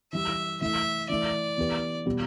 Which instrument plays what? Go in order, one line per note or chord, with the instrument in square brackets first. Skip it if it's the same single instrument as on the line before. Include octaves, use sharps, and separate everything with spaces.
[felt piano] E3 G3 E4 [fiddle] E5
[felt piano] E3 A3 E4 [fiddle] E5
[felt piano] E3 A3 E4 [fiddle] D5
[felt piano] E3 B3 G4 B4
B2 G3 B3 G4